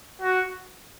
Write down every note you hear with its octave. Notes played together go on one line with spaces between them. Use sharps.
F#4